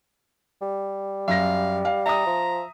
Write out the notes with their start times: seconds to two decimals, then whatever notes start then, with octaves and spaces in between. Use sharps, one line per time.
0.62 G3
1.28 F#2 F5 A#6
1.85 F5
2.06 E5 A#5 D#6
2.26 F3